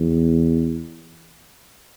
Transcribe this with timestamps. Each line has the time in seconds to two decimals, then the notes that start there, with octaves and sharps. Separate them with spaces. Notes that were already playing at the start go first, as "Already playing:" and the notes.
Already playing: E2